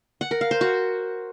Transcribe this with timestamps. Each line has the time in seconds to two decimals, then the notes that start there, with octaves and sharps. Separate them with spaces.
0.21 F#5
0.31 A#4
0.41 F5
0.51 C5
0.61 F#4